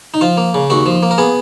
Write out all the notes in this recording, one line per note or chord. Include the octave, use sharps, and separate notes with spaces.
D#4
F3 F4
A#3
C#3
D#2 F#4
F3
A#3
A#4
B3 G#4